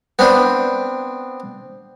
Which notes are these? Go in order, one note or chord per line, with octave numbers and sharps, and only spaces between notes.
B3 C4 D4